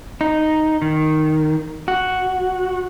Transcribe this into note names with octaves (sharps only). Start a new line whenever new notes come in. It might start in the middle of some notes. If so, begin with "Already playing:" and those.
D#4
D#3
F#4